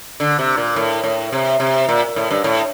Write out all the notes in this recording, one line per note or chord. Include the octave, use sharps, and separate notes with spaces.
D3
C3
A#2
A2
A2
C3
C3
A#2
A2
G2
A2